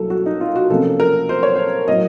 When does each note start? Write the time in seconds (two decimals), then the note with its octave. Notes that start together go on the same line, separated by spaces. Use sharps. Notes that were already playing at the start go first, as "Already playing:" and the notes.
Already playing: C2 F#3 A#3 A4
0.10 F#4
0.26 D#4
0.41 F4
0.56 F#4
0.70 C3 F3 A#3 C#4 A4
1.00 A#4
1.29 C5
1.43 C#5
1.55 C5
1.88 A2 F#3 A#3 D#5